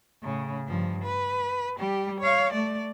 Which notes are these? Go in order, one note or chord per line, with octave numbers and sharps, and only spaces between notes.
A2 C#3
G2 F3
B4
G3 G4
C#5 F5
A3 D5